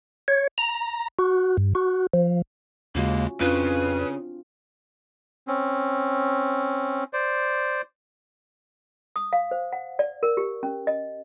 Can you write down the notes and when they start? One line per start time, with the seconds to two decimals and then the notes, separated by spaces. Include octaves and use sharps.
0.28 C#5
0.58 A#5
1.19 F#4
1.57 G2
1.75 F#4
2.13 F3
2.95 D#2 C#3 G#3 A#3 C#4 F4 F#4
3.41 F2 C#3 C4 D4 F4 B4
5.47 C4 C#4
7.13 C5 D5
9.16 D#6
9.33 F5
9.51 C5
9.73 F#5
9.99 D5
10.23 A#4
10.37 G4
10.63 C#4
10.87 D#5